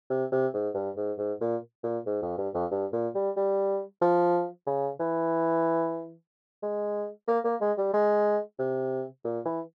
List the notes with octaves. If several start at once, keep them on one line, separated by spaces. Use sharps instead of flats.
C3
C3
G#2
G2
G#2
G#2
A#2
A#2
G#2
F2
G2
F2
G2
A#2
G3
G3
F3
C#3
E3
G#3
A#3
A#3
G#3
G3
G#3
C3
A#2
E3